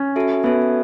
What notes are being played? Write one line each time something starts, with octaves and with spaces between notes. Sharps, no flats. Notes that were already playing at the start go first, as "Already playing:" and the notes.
Already playing: C#4
F#4 A4 E5
B3 F#4 A4 E5